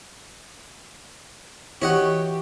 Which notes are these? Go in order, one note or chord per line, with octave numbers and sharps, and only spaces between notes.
E3 F#4 G4 C#5 D#5 F#5